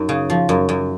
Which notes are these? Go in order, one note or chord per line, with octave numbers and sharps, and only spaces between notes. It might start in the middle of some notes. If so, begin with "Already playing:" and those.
Already playing: F#2 D#4
C#3
F3
F#2
F#2